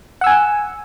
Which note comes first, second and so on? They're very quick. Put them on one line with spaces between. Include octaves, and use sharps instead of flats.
F#5 E6 G#5